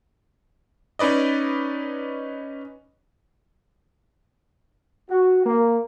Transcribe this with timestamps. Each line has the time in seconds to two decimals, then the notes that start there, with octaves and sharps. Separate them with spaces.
0.99 C#4 D#4 B4 D5 D#5
5.10 F#4
5.46 A#3